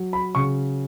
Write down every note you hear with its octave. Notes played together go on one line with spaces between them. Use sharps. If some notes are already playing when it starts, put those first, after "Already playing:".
Already playing: F#3
B5
C#3 C#6